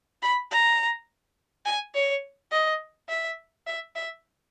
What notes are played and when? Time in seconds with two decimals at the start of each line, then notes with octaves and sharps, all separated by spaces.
0.23 B5
0.51 A#5
1.66 G#5
1.95 C#5
2.52 D#5
3.09 E5
3.67 E5
3.96 E5